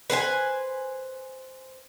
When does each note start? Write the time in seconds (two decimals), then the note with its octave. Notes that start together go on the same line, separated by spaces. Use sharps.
0.10 B4 C5 F5 G#5